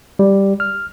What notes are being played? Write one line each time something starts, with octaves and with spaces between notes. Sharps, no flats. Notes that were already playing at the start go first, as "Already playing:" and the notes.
G3
F6